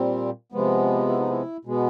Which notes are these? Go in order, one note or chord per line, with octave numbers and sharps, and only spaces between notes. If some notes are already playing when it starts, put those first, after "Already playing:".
Already playing: A#2 G3 C4
C3 F3 G#3 B3
E4
D#4
E4
B2 G#3 B3